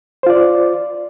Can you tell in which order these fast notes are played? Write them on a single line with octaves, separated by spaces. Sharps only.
C5 F4 D5